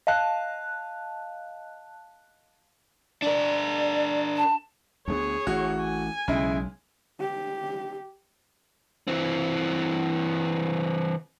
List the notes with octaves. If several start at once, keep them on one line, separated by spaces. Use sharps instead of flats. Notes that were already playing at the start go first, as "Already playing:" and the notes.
D#5 F5 A5 F#6
D4 A#4 D5
A5
D2 A#3 B3 G#4 C#5
A1 F#4
G#5
B1 C#3 G#3 E4
G4
E3 C4